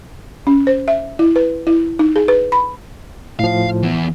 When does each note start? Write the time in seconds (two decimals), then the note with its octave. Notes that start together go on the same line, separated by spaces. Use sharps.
0.47 C#4
0.67 C5
0.88 E5
1.19 E4
1.36 B4
1.67 E4
1.99 D#4
2.16 G#4
2.28 B4
2.52 B5
3.39 A2 F3 F5
3.83 E3 B3